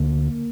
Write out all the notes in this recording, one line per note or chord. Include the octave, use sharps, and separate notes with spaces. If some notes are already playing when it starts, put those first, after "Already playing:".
Already playing: D2 D3 A#3